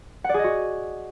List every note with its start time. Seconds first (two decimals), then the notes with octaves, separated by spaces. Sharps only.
0.24 F#5
0.29 D5
0.34 G#4
0.39 D#5
0.44 F#4